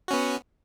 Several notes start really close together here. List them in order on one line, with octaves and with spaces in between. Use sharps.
F#4 C#4 B3